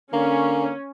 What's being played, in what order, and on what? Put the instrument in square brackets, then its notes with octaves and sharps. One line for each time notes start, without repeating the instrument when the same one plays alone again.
[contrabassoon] D3 [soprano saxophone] A#3 [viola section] C#4